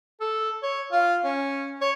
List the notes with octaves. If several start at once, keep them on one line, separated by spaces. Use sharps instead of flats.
A4
C#5
F4
C#4
C#5